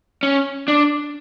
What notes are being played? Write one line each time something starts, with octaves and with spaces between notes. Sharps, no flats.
C#4
D4